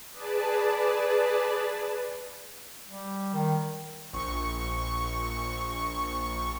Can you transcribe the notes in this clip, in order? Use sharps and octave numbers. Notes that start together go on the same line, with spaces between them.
G#4 B4 D5 A5
G3
D#3
A#1 C#6